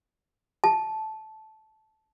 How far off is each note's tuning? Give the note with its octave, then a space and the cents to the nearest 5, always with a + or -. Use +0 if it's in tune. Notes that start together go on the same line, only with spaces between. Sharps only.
A5 -15